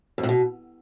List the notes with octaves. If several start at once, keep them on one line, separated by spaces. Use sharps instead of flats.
F2
A2
B2